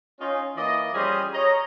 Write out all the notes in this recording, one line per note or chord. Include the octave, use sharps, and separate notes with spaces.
C#4 D#4 F4
E3 A#3 D5 D#5
F3 G3 C#4 G#4 C5 D#5
C#5 D#5 A#5